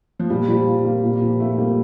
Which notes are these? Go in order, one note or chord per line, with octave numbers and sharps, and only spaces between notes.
F3
A#2 G3
F3 G3
F4
A#3
A#2
F3
A3 F4
G3 A#3